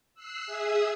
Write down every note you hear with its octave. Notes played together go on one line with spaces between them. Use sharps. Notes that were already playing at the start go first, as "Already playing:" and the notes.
E6 F#6 C7
G#4 E5 D#6 E6